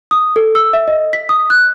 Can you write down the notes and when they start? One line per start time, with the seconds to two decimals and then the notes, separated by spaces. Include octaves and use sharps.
0.11 D#6
0.36 A4
0.55 E6
0.73 E5
0.88 D#5
1.13 B6
1.29 D#6
1.50 F#6